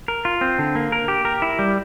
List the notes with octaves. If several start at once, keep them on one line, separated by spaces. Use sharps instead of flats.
A#4
F4
C4
D3
A#3
A#4
G4
A#4
E4
G3